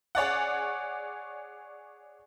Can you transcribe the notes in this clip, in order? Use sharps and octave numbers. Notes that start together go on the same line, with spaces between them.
G#4 C#5 D5 F#5